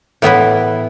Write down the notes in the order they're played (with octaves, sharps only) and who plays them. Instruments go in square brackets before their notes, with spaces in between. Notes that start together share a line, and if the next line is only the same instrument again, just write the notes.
[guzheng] A2 E3 B3 E4 B4